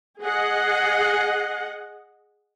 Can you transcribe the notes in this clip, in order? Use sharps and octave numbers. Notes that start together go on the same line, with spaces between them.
G#4 D#5 F#5